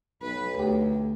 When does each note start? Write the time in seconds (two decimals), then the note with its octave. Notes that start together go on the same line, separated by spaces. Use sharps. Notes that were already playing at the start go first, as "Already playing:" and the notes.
0.22 B1 B4
0.59 D2 G4